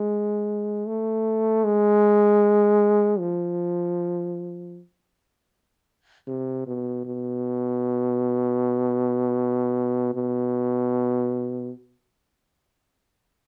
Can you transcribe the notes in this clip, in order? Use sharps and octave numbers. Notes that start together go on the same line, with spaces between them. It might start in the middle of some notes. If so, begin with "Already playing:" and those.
Already playing: G#3
A3
G#3
F3
C3
B2
B2
B2